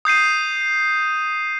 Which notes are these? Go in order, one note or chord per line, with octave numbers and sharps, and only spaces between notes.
D#6 G6 C7 D#7